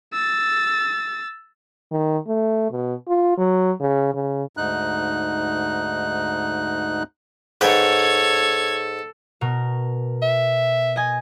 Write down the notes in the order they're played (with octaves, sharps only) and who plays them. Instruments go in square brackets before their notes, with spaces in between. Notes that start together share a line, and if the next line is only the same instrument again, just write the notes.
[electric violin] E6 A6
[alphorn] D#3
A3
B2
F4
F#3
C#3
C#3
[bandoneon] D2 G#2 D#4 F#6
[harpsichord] G#2 B4 G5 [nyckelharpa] A4 [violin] C#5 G#6
[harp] B2 A#4
[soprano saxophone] E5
[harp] D#5 G#5